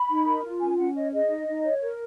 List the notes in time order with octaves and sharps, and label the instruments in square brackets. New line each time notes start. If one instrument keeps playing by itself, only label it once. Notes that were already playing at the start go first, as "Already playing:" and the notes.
Already playing: [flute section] B5
D#4
A#4
F4
C#4 G#5
C#4 F#5
C#5 D#5
G#4 D#5
D#4
D#4
C#5
A#4